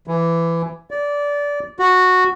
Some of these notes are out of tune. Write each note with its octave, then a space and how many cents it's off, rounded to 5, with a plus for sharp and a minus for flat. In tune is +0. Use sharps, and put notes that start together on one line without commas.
E3 +20
D5 -20
F#4 -10